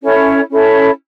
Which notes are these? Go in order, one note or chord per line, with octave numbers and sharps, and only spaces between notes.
C#4 E4 A4 C#5
C#4 E4 A4 C#5